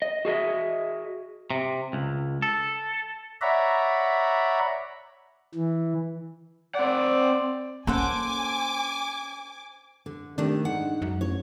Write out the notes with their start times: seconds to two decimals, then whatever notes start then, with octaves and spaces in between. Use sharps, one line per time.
0.02 D#5
0.25 F#4 G#4 D#5 E5
1.50 C3
1.93 C#2
2.42 A4
3.41 C#5 D5 E5 F#5 A#5 B5
5.55 E3
6.75 C4 D5 F#5
7.87 A#3 C#4 A4 C5 F#5 G#5 D6
10.06 D3
10.38 C3 D#3 A3 D4
10.65 G#2 F#5
11.02 F#2
11.21 A1 C#5